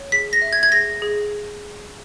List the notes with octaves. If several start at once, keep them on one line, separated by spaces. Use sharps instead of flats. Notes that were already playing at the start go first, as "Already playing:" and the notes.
Already playing: C#5
G#4 B6
A#6
E5
G#6
G#6
G#4 A#6
G#4